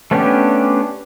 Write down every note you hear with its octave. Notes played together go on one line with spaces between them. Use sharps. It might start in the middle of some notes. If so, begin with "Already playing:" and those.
A3 B3 C#4 D4 G4